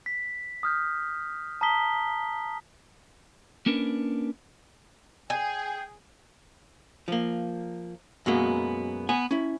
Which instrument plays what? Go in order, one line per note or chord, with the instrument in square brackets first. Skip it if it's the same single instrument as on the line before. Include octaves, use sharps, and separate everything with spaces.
[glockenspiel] B6
D#6 F6 G6
A5 A#5 D#6 B6 G7
[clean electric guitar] A#3 C#4 D4 A#4 B4
[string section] G#4 [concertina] G5 [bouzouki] G#5
[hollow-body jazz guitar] F3 A#3
F#2 B2 F#3 G#3 A#3 B3
B3 G#5
C#4 E4